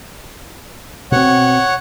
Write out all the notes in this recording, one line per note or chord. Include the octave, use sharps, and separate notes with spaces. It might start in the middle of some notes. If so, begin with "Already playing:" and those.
B2 C4 C#5 F#5